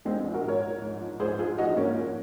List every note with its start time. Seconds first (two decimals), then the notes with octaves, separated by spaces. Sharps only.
0.05 A#1 G#3 C4
0.24 A#1
0.34 F#4 A#4
0.44 G#2 A#4 C#5
0.63 F3
0.82 G#2
1.01 F3
1.19 G#2 G#4 C5
1.39 F3 F4 G#4
1.58 A#1 D#4 F#4
1.77 G#2 A#3 C#4
1.96 F3